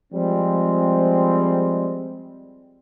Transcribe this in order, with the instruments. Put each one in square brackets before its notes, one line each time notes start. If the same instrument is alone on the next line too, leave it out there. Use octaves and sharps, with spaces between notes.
[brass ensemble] F3 G3 G#3 C4